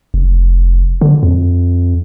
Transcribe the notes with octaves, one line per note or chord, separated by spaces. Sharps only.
F1
D3
F2